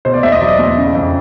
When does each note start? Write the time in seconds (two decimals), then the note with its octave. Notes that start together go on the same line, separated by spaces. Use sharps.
0.05 B2 C5
0.14 D5
0.23 E2 E5
0.32 D#5
0.41 F#3 D5
0.59 E2
0.77 C#3
0.95 F2